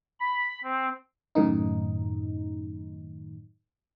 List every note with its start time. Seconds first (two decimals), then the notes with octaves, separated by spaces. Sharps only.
0.20 B5
0.64 C4
1.35 F#2 A2 D#3 D#4